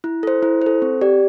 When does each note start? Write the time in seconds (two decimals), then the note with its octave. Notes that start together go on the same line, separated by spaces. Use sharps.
0.04 E4
0.23 A4 C5
0.43 E4
0.62 A4 C5
0.82 C4
1.01 G4 D5